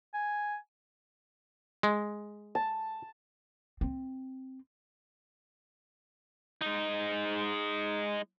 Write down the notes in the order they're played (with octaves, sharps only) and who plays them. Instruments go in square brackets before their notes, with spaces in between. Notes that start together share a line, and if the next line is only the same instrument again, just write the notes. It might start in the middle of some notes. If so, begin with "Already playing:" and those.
[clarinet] G#5
[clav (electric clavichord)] G#3
[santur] A5
[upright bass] C4
[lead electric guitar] G#3 D#4